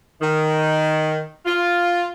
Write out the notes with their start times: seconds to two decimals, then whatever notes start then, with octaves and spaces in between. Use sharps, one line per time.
0.20 D#3
1.46 F4